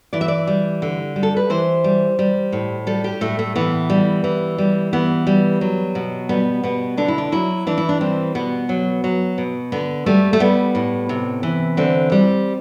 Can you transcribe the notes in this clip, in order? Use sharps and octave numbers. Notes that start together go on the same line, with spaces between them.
E3 D5
E5
D5
G3
D3
G3
A4
B4
E3 C5
G3
G3
A2
G3 A4
G4
A2 A3
A3
E3 B3
G3
E3
G3
E3 B3
G3
F#3
B2
G3 B3
B2 B3
D3 D4
E4
D4
F#3 E4
E3 D4
E4
D4
G3 C4
B2 B3
F#3
F#3
B2
D3 B3
G3 A3
A3
G3 B3
A2
C3
E3
D3 C4
G3